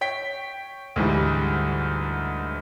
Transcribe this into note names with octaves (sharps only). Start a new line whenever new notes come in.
C#5 G5 B6
D2 G#2 E3 G3